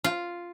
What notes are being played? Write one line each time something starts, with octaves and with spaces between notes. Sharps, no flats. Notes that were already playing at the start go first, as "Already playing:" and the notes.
F4